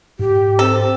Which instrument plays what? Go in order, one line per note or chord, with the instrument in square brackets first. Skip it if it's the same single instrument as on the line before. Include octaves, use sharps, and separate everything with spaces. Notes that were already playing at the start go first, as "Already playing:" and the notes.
[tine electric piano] G#2 [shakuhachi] G4
[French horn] C4 [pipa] A4